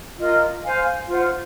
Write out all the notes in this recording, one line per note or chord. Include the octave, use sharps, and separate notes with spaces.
F4 A#4 D#5
C5 F5 G#5
F4 C5 F#5